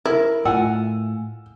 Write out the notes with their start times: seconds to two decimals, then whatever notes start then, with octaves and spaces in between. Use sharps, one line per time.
0.06 E4 A#4
0.45 A2 F4 F#5 G#5 E6